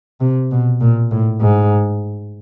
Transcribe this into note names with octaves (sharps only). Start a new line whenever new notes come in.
C3
B2
A#2
A2
G#2